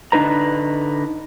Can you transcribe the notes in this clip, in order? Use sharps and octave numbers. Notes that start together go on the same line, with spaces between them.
D3 D4 D#4 B4 A#5